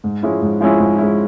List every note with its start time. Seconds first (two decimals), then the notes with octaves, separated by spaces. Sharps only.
0.04 G#2
0.23 F3 G#3 C#4 E4
0.42 G#2
0.61 F3 G#3 C#4 E4
0.80 G#2
0.98 F3 G#3 C#4 E4